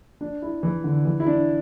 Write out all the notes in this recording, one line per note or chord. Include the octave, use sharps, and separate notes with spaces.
D4
E4
E3
D3
E3
E4
D4